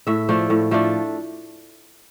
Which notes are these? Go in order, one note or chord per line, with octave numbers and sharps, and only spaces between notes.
A2 E5
F3 A3 D4
A2
F3 A3 D4